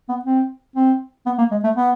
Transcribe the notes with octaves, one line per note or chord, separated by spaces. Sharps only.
B3
C4
C4
B3
A#3
G#3
A3
B3